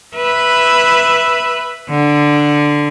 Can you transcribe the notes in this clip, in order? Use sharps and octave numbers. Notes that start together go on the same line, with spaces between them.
B4 E5
D3